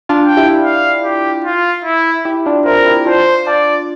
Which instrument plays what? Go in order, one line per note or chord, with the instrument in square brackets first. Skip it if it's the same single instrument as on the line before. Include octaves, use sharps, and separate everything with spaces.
[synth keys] D4 F4
[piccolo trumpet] G5
[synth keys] E4 G4
[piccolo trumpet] F5
G4
F4
E4
[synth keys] E4 G4
D4 F4
[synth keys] C4 E4 [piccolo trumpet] A#4
[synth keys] E4 G4
[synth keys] D4 F4 [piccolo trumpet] C5
[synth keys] D4 F4 [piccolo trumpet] D5